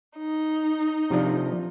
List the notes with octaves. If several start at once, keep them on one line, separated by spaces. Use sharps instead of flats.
D#4
C3 F3 D4